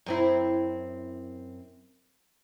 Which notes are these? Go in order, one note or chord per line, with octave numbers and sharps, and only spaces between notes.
F#2 C4 E4